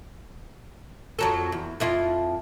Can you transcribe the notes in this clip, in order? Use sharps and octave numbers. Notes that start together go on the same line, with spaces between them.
F2 F#3 A4
E2
F2 E4 F4